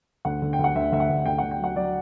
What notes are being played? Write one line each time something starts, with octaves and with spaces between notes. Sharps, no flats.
D2 F#5
D3
G5
D2
F#5
D2 E5
D2 E5
F#5
D2
D2 G5
D2 F#5
G5
F#3 F#5
F#3 D5